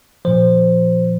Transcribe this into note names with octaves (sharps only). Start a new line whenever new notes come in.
A#2 F3 C5